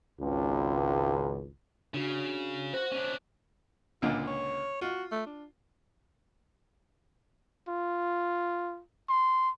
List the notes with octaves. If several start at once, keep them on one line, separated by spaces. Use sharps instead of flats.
G#1 C#2
C#3 D4 F#4
F#4 C5 F#5
C#4 D4
C#2 A#2 D3 F4
C#5
F4 F#4
A3
D4
F4
C6